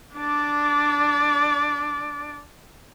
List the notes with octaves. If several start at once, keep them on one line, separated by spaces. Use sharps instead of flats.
D4 D5